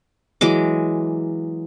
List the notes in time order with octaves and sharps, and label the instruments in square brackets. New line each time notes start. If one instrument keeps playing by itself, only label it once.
[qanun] E3 F#3 G#3 D6